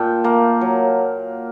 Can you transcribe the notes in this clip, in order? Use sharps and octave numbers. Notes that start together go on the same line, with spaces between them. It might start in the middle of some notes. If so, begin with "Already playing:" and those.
Already playing: A#2 G5 A5
A#3
F#3